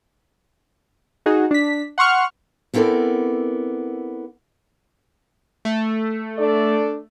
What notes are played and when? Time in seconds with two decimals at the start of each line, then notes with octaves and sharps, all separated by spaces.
1.26 D#4 F#4 G#4
1.51 D4 B6
1.98 F#5 C6 C#6 F6
2.74 B3 C4 E4 A4 A#4 D5
5.65 A3
6.37 D4 A4 D5